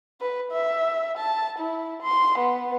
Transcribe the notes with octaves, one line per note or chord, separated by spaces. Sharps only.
B4
E5
A5
E4
C6
B3